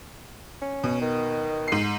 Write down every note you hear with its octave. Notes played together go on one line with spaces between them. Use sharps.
C#4
B2
D#3
G#2 C7